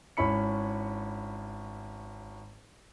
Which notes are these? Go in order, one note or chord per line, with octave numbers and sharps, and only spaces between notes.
G#1 C#4 E4 B5 C#7